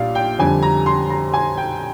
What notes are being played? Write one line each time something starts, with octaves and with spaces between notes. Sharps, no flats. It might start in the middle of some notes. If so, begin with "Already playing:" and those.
Already playing: A#1 A#2 G3 D5 F5
G5
F2 D3 G3 G#5
A#5
C6
A#5
G#5
G5